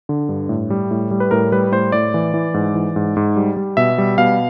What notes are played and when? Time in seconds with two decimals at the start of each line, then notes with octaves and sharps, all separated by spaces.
0.09 D3
0.29 G2
0.49 A2
0.70 G3
0.91 A2
1.11 G3
1.20 B4
1.31 A2 A#4
1.52 G3 B4
1.72 A2 C5
1.92 A2 D5
2.14 E3
2.34 E3
2.54 G#2
2.75 E3
2.96 G#2
3.17 G#2
3.36 G3
3.57 G3
3.77 B2 E5
3.98 G3
4.18 B2 F5